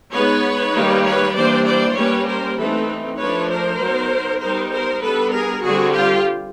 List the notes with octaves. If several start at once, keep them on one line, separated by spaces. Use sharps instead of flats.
G#3 B3 D#4 B4 C#5
D#3 G3 A#3 D#4
B4 C#5
E3 G3 A#3 D4 C5 D5
C5 D5
G3 A#3 C#4 B4 C#5
A#4 C5
E3 A3 C4 D#4 A4 B4
F3 A3 D4 B4 C#5
A#4 C5
F#3 B3 D#4
G3 B3 D#4 A#4 C5
A#4 C5
G3 B3 D4 A4 B4
G#4 A#4
D3 G3 C4 F#4 G#4
F4 G4